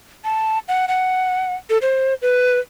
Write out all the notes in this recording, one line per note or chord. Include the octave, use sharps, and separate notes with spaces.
A5
F#5
F#5
A4
C5
B4